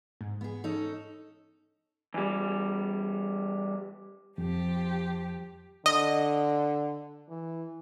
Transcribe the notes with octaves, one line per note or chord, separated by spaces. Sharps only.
G#2
B3 G#4
C#4 D#4 A4
E2 G3
F2 F3 G4
D3 D#5
E3